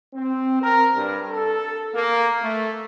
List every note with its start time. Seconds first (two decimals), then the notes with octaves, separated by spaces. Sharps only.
0.13 C4
0.60 A#4
0.95 G2
1.30 A4
1.94 A#3
2.40 A3